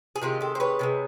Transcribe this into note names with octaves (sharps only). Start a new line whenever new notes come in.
G#4
C3 D#3 G#3 F4 G4
G4 A4
C5
B4 C#5
C3 D#3 G#3